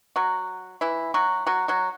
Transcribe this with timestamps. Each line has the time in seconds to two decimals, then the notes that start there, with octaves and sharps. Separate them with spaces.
0.16 F#3 F#4
0.81 E3 E4
1.14 F#3 F#4
1.46 F#3 F#4
1.68 F#3 F#4